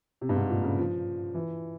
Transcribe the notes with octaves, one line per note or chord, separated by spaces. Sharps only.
C3
G2
G#2
A#2
C#3
F3
E3